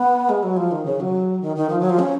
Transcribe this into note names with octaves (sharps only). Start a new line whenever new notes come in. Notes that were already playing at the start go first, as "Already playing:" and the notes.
Already playing: B3
G#3
F#3
F3
D#3
C#3
F#3
D#3
D#3
F3
F#3
F3
C#4